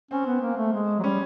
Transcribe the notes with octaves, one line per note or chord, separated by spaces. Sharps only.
C4 C#4
B3
A#3
A3
G#3
F#3
G3 C#4